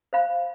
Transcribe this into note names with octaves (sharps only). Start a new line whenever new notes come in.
C5 F5 B5